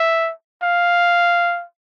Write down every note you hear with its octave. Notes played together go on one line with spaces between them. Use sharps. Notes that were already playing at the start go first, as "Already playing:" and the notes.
Already playing: E5
F5